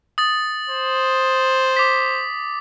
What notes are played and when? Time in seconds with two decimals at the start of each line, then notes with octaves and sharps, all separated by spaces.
0.18 D#6 A6
0.70 C5
1.77 D6 B6